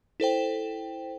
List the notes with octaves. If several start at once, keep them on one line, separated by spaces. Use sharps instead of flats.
E4 A4 C5 G5